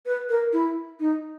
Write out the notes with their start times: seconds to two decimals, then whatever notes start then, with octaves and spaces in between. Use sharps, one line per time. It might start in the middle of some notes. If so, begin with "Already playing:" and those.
0.06 B4
0.29 A#4
0.53 E4
1.00 D#4